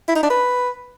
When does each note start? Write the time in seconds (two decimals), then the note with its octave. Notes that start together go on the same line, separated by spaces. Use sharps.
0.09 E4
0.16 D#4
0.23 D4
0.30 B4